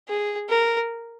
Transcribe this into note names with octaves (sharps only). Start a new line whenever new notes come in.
G#4
A#4